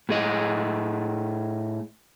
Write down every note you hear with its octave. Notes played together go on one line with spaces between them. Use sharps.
A2 G#4 D#5